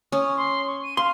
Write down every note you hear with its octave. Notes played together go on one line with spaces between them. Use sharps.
C#4 D#6
C6
C#6
D#7
F5 C6